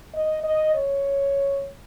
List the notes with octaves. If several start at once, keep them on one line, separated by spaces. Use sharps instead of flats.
D#5
D#5
C#5